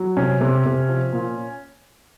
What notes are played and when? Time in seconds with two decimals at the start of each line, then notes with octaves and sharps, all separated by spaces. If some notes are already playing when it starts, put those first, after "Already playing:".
Already playing: F#3
0.17 C3 C#4
0.41 C3
0.66 C3
0.89 F3
1.13 A#2